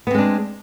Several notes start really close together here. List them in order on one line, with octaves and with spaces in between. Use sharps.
B3 C4 G#3 D4